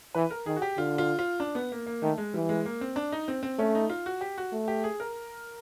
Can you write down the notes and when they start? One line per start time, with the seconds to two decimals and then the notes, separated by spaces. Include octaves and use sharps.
0.15 E3 B4
0.30 A#4
0.46 D#3 G#4
0.56 F#4
0.62 G4
0.78 D3 F4
0.98 F4
1.19 F4
1.40 D4
1.55 B3
1.72 A#3
1.86 A#3
2.02 D#3 A3
2.18 G#3
2.34 E3 G3
2.49 G#3
2.65 A#3
2.81 C4
2.96 D4
3.12 D#4
3.28 C4
3.43 C4
3.58 A3 C#4
3.75 D#4
3.90 F4
4.06 F#4
4.21 G4
4.38 F#4
4.52 A3
4.68 G4
4.84 G#4
5.00 A#4